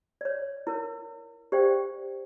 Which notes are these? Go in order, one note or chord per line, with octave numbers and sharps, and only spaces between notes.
C#5 D5
E4 A#4 C#5
G4 C5 D5 F5 G5
D5